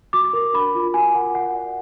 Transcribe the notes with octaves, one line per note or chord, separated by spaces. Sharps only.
F#4 D6
A#4
D4 B5
F4
F#4 G#5
A#4 F#5
F#4 F#5
D5